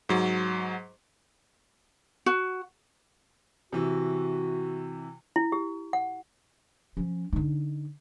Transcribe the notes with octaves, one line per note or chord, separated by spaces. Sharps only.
G#2 F#3
F#4
C3 E3 F#4
E4
G4
F#5
F3 C#4
D3 D#4